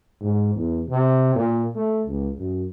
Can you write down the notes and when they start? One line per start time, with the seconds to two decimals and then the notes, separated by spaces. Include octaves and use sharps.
0.21 G#2
0.55 E2
0.89 C3
1.35 A#2
1.75 A3
2.07 C#2
2.38 F#2